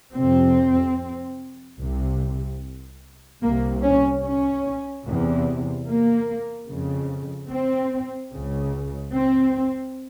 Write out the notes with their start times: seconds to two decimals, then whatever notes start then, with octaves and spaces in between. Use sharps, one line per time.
0.15 F2 C3 C4
1.79 C2 C3
3.42 C2 C3 A#3
3.83 C#4
4.23 C#4
5.05 E2 C3
5.88 A#3
6.69 F2 C#3
7.51 C4
8.33 C#2 C#3
9.15 C4